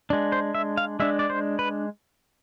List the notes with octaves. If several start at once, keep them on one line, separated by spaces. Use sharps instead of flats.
G#3 D4
C5
E5
F5
G#3 D4 E5
D5
C5
B4